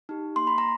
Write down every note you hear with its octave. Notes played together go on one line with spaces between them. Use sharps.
D#4 G4
A#3 C6
B5
A#5